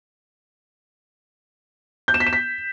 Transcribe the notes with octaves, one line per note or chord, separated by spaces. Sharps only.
G6
E7
B6
E7
B6